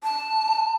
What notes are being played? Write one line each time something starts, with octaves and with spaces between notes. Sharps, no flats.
A5